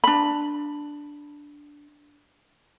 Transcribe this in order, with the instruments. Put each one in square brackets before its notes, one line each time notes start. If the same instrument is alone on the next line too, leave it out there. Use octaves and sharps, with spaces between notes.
[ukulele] D4 B5